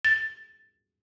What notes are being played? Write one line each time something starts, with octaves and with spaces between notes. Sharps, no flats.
A6